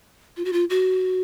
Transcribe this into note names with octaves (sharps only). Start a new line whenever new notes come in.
F4
F#4
F4
F#4